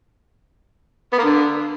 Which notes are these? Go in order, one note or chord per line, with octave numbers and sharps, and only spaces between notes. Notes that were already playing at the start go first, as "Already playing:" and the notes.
B3
A#3
D3